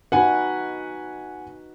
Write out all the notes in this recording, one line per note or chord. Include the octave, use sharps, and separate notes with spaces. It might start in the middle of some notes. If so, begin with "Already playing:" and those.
D#4 F#4 B4 F#5 G#5